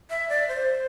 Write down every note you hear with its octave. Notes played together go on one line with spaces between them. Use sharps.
E5
D5
C5